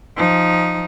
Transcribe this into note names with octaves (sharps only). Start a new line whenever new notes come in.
F3 D#4